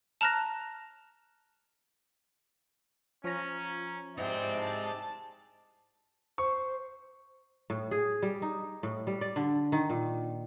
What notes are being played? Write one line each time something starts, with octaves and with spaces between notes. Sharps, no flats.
A5 A#5 F6 F#6 A#6
F3 C#4 A#5
C3 C4 D#4 E4 G#4 D5 G5
A5
C5 C#6
A2
G#4
G3
D#4
A2
G3
D5
D3
D#3
A#2